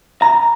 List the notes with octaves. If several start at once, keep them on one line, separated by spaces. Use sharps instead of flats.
A#5